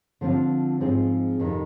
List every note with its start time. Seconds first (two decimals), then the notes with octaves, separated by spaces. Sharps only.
0.21 D3 F3 C4 F4
0.80 G#2 F3 C4 F4 G#4
1.39 F2 C3 D#3